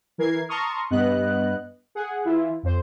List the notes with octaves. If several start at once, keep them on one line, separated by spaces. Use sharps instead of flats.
E3 A#4 G#6 C7
A5 A#5 C6 C#6 D#6 F6
G2 B3 D#5 F#6
G#4 F#5
E3 E4 F4
F2 C5